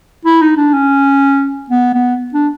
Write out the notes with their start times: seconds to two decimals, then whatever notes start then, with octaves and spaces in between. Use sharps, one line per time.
0.25 E4
0.42 D#4
0.57 D4
0.73 C#4
1.70 B3
1.94 B3
2.34 D4